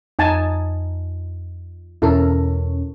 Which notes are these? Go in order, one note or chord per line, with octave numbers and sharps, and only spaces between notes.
F2 D#4 G#5 A5
E2 B2 C#4 E4 A4 A#4